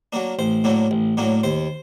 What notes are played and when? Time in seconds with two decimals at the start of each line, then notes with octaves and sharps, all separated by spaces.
0.13 F#3 A#3 D4
0.39 A1 C5
0.64 A2 F#3 A#3 D4
0.91 A1
1.17 A2 F#3 A#3 D4
1.43 D#2 C5